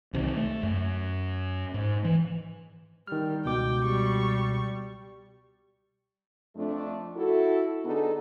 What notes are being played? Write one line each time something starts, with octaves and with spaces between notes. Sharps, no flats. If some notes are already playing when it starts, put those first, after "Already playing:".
C2 C3 D#3
A3
F#2
G#2
E3
D#3 G3 F6
C#2 B2 G5 D6
G3 C#6
F2 A3 D4
E4 F#4 A4
D3 B3 D4 D#4 G#4 A4